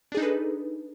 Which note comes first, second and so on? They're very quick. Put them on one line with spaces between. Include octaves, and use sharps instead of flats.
D4 G#4 D#4 A4 B4